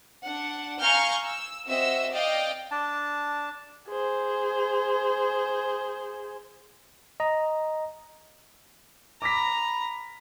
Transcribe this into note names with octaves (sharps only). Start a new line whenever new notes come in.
D4 F#5
F5 G#5 A#5 C#6 F6 G6
E6
C4 F#4 D#5 E5 E6
D5 D#5 F5 G5
D4 A5
G#4 C5
D#5 A#5
A#5 B5 D6 A#6 B6